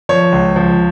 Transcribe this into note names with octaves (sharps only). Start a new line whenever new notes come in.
F3 C#5
C#2
F3